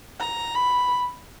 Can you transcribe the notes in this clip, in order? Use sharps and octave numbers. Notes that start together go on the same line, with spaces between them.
A#5
B5